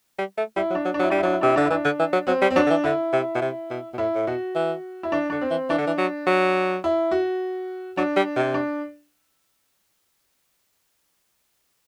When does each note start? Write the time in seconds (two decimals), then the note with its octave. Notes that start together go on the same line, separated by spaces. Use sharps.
0.18 G3
0.37 A3
0.56 G3 E4
0.70 F#3
0.75 D4
0.85 F#3
0.94 D4
0.99 F#3 E4
1.10 G3 D4
1.18 E4
1.23 F#3 D4
1.33 E4
1.41 C3 D4
1.49 E4
1.56 D3 D4
1.65 E4
1.70 E3 D4
1.85 D3
1.99 E3
2.13 F#3
2.27 F#3 C4
2.42 G3
2.50 C4
2.56 F#3 D4
2.66 D3
2.70 E3
2.84 D3 E4
3.13 C3
3.35 B2
3.41 C3
3.70 B2
3.93 B2
3.98 A2 E4
4.15 A2
4.27 B2 F#4
4.55 E3
5.03 E4
5.12 E3 D4
5.30 D3 D4
5.41 C4
5.51 E3
5.69 E3 D4
5.78 D3
5.87 E3
5.98 F#3
6.27 F#3
6.84 E4
7.11 F#4
7.97 F#3 D4
8.16 G3
8.36 C3
8.54 D4